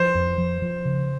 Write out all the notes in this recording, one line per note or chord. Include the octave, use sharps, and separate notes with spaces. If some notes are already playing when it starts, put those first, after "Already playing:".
Already playing: F3 C5
F2
F3
F3
C#3